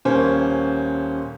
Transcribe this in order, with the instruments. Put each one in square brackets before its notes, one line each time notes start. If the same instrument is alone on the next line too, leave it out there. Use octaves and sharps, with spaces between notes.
[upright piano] D#1 A#3 C#4 C5